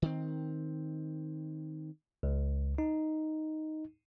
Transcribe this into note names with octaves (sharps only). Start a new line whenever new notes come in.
D#3 C4
C#2
D#4